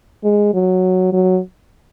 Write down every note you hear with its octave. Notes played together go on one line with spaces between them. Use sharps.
G#3
F#3
F#3